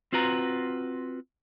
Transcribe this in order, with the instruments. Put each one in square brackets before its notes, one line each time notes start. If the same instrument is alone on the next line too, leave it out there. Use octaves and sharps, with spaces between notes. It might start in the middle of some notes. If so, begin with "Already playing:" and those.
[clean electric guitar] C4 F4 F#4 B4 A#5